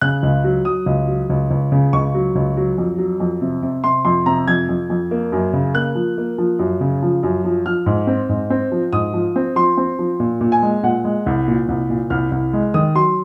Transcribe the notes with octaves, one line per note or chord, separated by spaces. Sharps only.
C#3 F#6
C#2
F#3
F#3 D#6
C#2
F#3
C#2
C#2
C#3
C#2 C#6
F#3
C#2
F#3
F2
F#3
F2
C3
C3
C3 C6
F2 C6
C3 A#5
F2 G#6
F2
F2
A#3
F#2
C#3
A#3 F#6
F3
A#3
F3
F#2
C#3
F3
F#2
F3
F3 F6
G#2
C4
G#2
C4
F3
G#2 D#6
F3
C4
F3 C6
C4
F3
A#2
A#2
G#5
G#3
A#2 F#5
G#3
C2
A#2
C2
A#2
C2 F6
C2
G#3
D#3 D#6
F#3 C6